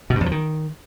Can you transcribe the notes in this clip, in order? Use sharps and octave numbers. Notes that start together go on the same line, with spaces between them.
B2
G2
E2
F3
D#3